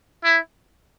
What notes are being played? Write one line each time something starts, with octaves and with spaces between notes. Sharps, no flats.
E4